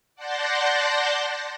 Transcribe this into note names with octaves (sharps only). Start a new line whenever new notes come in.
D5 F#5 A5 C6 G6 A#6